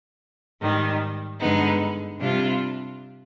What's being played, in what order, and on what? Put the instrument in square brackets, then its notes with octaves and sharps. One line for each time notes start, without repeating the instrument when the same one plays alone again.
[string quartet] G#2 D#3 G3
G2 D3 G#3 B3 D#4
C3 G3 D4 F4